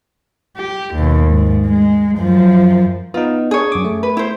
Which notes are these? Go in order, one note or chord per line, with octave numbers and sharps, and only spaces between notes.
G4
D#2 B2
G#2
G#3
F#2 F3
B3 D#4 F4
D4 G#4 C#5
F#2 D6
A3
B4
E4 C5